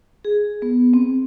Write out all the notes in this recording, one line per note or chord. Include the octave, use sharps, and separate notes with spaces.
G#4
B3
C4